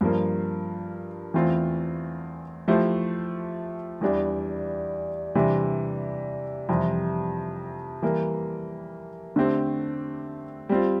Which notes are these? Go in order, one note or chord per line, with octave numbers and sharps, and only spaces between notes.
G2 F3 A#3
E2 E3 A3 C4 F4
F3 A3 E4 G4 C5
E2 E3 G3 D4
C3 E3 G3 D4
F2 C3 E3 G3
E3 G3 A#3
D3 A3 C4 G4
G3 C4 F4